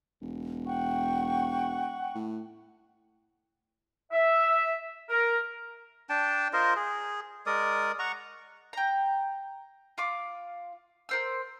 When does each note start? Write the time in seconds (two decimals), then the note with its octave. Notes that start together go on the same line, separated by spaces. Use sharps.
0.21 E1
0.66 F#5 G5 C#6
2.15 A2
4.12 E5
5.10 A#4
6.09 D4 G5 A5
6.53 F4 A#4 C5 D#5
6.76 G#4
7.46 G#3 A#4 D5 D#6
7.99 F#5 A#5 C#6
8.73 G5 A#5
9.98 F4 F5 D6
11.09 A#4 C5 E6